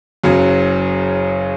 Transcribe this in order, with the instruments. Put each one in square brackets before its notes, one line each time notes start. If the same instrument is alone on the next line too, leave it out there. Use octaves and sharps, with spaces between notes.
[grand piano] F#1 F#2 C#3 F#3